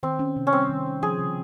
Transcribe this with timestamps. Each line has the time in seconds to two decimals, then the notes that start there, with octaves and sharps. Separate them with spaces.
0.03 D#3 C4
0.19 C#4
0.36 C3
0.47 C#4
0.53 G3 C4
0.69 D#3
0.86 C#4
1.03 F3 G#4
1.19 C#3